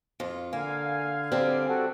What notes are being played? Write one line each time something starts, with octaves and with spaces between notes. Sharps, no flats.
F2 F4
D3 A#3 F5 G#5
G3 C4 D4
F#4 A4 F#5